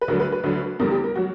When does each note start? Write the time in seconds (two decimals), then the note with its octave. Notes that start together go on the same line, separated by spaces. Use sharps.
0.01 B4
0.08 D2 D3 F#3 A#4
0.20 B4
0.32 B4
0.44 D2 D3 F#3
0.79 E2 D3 G3 A#4
0.91 G4
1.04 A#4
1.15 F#3 F#4